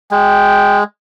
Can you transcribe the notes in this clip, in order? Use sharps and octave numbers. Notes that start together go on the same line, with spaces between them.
G#3 G5